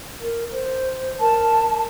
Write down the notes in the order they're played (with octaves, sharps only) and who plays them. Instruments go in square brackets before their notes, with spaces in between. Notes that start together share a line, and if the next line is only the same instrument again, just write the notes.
[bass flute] A#4
C5
[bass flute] A#4 [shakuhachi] A5